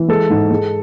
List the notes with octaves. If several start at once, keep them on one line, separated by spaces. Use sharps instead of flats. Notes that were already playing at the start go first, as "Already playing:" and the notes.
Already playing: E3
G#3 A4
G#2
G#3